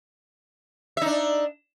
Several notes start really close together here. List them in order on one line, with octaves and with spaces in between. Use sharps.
E5 D#4 D4